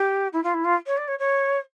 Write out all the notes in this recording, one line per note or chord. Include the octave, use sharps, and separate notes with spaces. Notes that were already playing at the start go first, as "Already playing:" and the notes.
Already playing: G4
E4
F4
E4
F4
C#5
D5
C#5
C#5